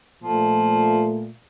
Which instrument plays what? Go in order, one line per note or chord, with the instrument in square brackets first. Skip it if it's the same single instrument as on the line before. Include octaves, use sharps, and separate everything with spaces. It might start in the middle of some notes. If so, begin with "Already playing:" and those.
[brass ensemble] A#2 A3 [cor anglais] F3